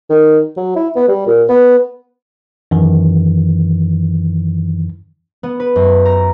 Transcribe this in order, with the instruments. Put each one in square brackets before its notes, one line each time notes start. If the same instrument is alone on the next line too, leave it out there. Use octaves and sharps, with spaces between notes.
[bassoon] D#3
F#3
E4
B3
G3
A#2
B3
[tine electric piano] F#2 D#3 E3
[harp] B3
B4
F#2
A#5